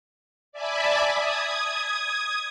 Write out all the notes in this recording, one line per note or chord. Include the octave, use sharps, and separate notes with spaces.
D5 E5 G#5 A5 B5 D6
D#6 G#6